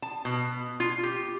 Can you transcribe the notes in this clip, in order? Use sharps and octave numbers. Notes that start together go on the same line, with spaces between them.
A5
B2
F4
G4